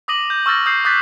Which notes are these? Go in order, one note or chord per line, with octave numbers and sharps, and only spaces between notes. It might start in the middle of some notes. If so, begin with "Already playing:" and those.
D6 D#6 A#6 D#7 F#7
G6
C#6 E6 F6 A6 A#6
D#6 G6 C7
D6 D#6 F#6 G6 A6 B6